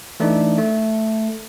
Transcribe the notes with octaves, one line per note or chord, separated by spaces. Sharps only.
E3 A3 D4 D#4 D5
A3